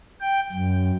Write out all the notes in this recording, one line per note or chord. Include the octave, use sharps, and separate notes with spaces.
G5
F#2